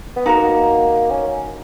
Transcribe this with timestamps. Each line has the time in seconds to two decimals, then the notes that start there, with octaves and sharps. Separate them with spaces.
0.17 B3
0.26 A#3 D#4 F#4 A#4
1.11 C#4